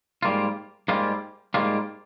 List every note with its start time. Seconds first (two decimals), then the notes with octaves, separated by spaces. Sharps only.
0.23 G#2 G3 A#3 F4
0.88 G#2 G3 A#3 F4
1.54 G#2 G3 A#3 F4